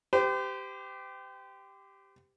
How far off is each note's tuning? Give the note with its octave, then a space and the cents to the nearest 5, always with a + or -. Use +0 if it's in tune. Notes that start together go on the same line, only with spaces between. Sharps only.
G4 +0 C5 -40